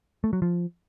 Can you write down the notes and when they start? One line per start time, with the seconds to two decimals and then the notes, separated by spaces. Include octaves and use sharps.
0.24 A3
0.33 F#3
0.42 F3